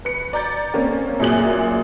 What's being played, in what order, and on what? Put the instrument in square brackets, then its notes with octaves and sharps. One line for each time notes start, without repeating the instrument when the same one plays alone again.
[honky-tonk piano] B4 C#7
D5 A#5 G6 A6
A#3 C4 C#4
F#2 A#2 G#4 F#6 F#7